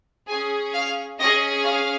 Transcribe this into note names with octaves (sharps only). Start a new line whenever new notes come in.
C#4 G#4 G#5
F5
C#4 G#4 D#5
F5